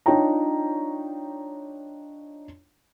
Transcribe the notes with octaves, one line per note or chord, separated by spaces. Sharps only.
D4 D#4 F4 C#5 G5 A#5